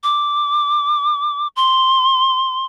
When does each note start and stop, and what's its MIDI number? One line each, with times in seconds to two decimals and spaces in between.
0.03 1.48 86
1.56 2.65 84